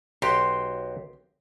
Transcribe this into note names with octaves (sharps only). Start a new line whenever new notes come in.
B1 F#4 G4 C6